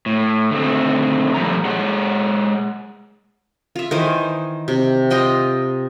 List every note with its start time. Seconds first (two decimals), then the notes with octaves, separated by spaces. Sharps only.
0.06 A2
0.51 D3 D#3 A3 C4
1.34 A#2 F3 G3 A3 A#5
1.65 G#3 G#4 C#5 F#5
3.76 F4 E5
3.91 D#3 E3 C5 G#5
4.68 C3
5.10 F4 D#5 G5 C6